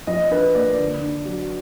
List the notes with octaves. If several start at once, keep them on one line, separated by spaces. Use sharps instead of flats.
F3 D#5
D4 B4
A#3 D5
D3
D4
F#3